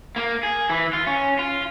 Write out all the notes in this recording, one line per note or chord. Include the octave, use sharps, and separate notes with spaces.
A#3
G#4
E3
F4
C#4
F4